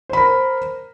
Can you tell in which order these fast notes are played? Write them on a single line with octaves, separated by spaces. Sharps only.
C5 B5 A#4